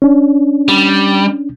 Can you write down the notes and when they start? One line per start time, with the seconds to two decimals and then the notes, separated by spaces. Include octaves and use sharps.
0.02 C#4 D4
0.69 G3